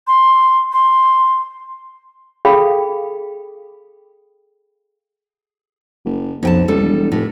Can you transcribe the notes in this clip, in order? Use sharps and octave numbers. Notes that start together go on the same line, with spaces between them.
C6
C6
G#4 A4 F5 G5 B5
F#1
B1 F2 G5 A5
C#2 G3 A4
E1
F1 A2